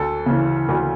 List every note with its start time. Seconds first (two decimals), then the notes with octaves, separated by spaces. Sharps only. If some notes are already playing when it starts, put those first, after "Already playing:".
Already playing: D2 A4
0.26 C#3 E3
0.69 D2